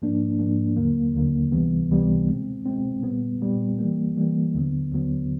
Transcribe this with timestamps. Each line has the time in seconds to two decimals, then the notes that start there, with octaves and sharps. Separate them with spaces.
0.02 G#2 F3 A#3 D4
0.39 G#2 F3 A#3 D4
0.76 D#2 D3 F#3 A#3
1.15 D#2 D3 F#3 A#3
1.52 C#2 C3 E3 G3 B3
1.90 C#2 C3 E3 G3 B3
2.28 B2 G#3 C4
2.66 B2 G#3 C4
3.03 A#2 G3 B3
3.41 A#2 G3 B3
3.79 E3 G3 A#3
4.16 E3 G3 A#3
4.54 D#2 D3 F#3 B3
4.92 D#2 D3 F#3 B3